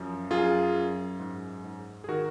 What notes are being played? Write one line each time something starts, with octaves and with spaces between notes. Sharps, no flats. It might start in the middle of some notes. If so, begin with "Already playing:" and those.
Already playing: F#2 F3
F#2 F4 G#4
F#2
G#2
G#2
G#4
D#3 F#4 A#4